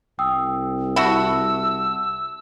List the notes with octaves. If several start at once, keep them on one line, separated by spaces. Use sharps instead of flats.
C2 G5 D#6 E6
E4 F#4 E5 A5 E6